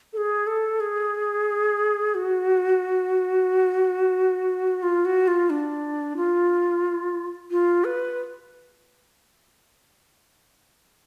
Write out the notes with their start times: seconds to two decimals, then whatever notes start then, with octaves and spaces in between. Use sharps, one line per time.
0.13 A4
0.17 G#4
0.47 A4
0.80 G#4
2.15 F#4
4.83 F4
5.05 F#4
5.28 F4
5.50 D4
6.17 F4
7.51 F4
7.84 B4